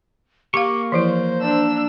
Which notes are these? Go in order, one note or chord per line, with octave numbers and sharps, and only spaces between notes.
A#3 G4 F5 C#6 D6
E3 F3 E4 C5
D4 E6